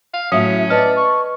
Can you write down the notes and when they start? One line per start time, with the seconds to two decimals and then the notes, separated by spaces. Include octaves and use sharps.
0.14 F5
0.32 A2 F#3 C#4 E5 D#6
0.70 B4 D5 D#5 A5 F6
0.96 C#6